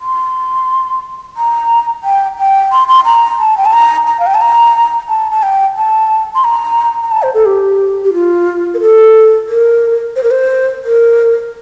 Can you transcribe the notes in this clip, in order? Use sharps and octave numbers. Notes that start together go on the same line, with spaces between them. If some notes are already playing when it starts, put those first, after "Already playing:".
C6
A#5
G5
G5
C6
C6
A#5
A5
G5
A5
A#5
A#5
F5
G5
A5
A#5
A5
A5
G5
A5
C6
A#5
A#5
A5
C5
A4
G4
G4
F4
A#4
A4
A#4
C5
A#4
C5
A#4